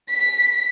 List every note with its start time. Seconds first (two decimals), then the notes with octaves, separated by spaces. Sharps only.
0.11 B6